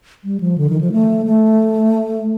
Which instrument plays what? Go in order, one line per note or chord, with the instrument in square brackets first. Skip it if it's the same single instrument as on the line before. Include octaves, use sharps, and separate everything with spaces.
[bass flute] G3
F3
D3
D#3
F3
A3
A3